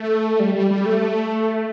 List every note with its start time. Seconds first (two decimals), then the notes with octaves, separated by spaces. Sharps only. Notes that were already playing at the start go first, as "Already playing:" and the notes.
Already playing: A3
0.40 G3
0.55 G3
0.71 G3
0.86 A3